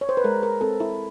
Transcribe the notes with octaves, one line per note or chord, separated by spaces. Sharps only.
C#5
C5
B4
G#3 A#4
A#4
C4 A4
E4